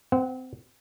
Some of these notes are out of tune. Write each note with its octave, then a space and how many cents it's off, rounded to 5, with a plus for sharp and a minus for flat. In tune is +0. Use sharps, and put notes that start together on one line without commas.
C4 -25 F#5 +0